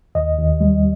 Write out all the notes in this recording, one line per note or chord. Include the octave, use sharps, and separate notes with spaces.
D#2 D#5
D#2
G3